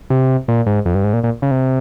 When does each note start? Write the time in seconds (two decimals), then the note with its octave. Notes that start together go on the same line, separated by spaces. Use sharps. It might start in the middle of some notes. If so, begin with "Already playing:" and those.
0.10 C3
0.48 A#2
0.66 G#2
0.86 F2
0.95 G2
1.04 G#2
1.13 A#2
1.24 A#2
1.42 C#3
1.51 C3